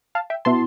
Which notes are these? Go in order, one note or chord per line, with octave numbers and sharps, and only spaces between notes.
F5 A5
E5 G5
B2 B3 E4 A5 C6